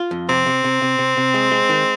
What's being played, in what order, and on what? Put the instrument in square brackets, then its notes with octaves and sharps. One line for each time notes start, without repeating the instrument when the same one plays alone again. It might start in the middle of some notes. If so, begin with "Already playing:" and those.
Already playing: [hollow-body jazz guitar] F4
F2
[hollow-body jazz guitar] C3 [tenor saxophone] C4
[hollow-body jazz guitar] C3
C3
C3
C3
C3
G#3
G#3
D#3